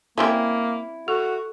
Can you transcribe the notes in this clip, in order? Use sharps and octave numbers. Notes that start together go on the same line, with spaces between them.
G3 A#3 C4 C#4 E4
F#4 A4